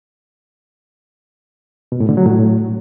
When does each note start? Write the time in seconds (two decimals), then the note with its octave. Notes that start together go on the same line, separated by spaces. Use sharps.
1.92 B2
2.00 A2
2.09 D3
2.17 F#3
2.26 A2